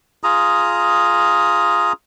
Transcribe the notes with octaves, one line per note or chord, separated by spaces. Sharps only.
F4 G#4 A#5 D#6